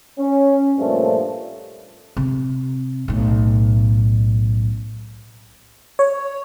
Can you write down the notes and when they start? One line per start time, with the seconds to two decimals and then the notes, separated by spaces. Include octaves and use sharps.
0.19 C#4
0.79 G2 A#2 F3 A3 D4
2.17 C3
3.08 B1 A2
5.99 C#5